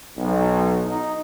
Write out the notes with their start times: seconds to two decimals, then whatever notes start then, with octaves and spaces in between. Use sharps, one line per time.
0.17 B1
0.86 D#4